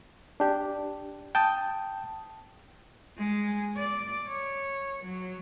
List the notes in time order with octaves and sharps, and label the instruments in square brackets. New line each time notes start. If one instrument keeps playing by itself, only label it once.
[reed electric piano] D4 G4
G5 A5 D#6
[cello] G#3
D5
C#5
F#3